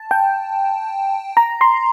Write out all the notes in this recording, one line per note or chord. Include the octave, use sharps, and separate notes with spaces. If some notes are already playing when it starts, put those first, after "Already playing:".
Already playing: A5
G5
A#5
C6